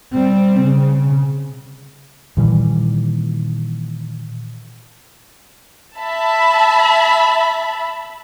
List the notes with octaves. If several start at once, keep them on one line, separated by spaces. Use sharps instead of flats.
G3 C4
C#3
A#2 D#3 E3 G3
E5 A5 B5